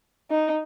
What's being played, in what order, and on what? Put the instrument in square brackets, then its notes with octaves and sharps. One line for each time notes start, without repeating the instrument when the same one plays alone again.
[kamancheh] D#4